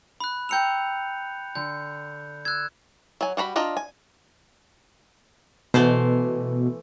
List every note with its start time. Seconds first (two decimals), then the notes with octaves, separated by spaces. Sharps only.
0.20 B5 F#6
0.49 G5 A#5 E6 G6 C#7 F7
1.55 D3 G6
2.45 E6 F#6 G#6
3.21 F#3 G#5
3.37 G3 F#4 A#5 B5
3.56 D4 F4 D#5 A#5
3.77 G#5
5.74 B2 E3 A3 C5